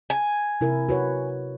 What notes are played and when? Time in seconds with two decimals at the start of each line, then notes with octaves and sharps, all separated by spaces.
0.10 G#5
0.61 C3 E4 A#4
0.89 F#4 B4 C#5